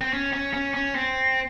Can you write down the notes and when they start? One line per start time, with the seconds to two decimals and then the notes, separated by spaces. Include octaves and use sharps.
0.01 C4
0.13 C#4
0.33 C#4
0.54 C#4
0.74 C#4
0.95 C4